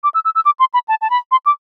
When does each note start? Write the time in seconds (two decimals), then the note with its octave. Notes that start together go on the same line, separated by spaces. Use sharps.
0.04 D6
0.14 E6
0.25 E6
0.35 E6
0.45 D6
0.60 C6
0.74 B5
0.88 A5
1.02 A5
1.10 B5
1.31 C6
1.46 D6